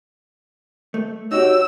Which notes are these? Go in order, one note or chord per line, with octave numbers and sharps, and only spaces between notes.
A3
D#4 F#4 G4 C#5 E6